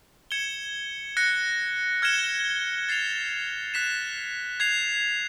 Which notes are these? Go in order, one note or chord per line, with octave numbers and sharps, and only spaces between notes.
G#6 C#7 E7 G7
F#6 A#6 C#7
F6 G#6 C#7 E7 G7
A6 C7 F7
F#6 B6 E7
G#6 C7 F7